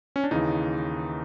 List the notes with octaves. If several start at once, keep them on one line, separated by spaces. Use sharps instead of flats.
C#4
D4
D#2 C#3 E3 D#4